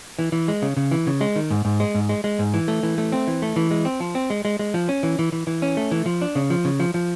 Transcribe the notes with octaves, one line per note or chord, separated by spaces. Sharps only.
E3
E3
G#3
C#3
C#3
E3
C#3
G#3
D#3
G#2
G#2
G#3
G#2
G#3
G#3
G#2
E3
A3
E3
A3
C4
E3
A3
E3
G#3
C4
F3
C4
G#3
G#3
G#3
F3
C#4
E3
E3
E3
E3
C#4
A3
E3
F3
D4
C#3
F3
C#3
F3
F3